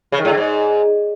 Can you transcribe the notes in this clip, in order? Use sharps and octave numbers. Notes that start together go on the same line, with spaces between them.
C#3
D#3
A2
D3
G#2